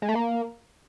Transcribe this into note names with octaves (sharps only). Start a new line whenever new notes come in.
G#3
A3
A#3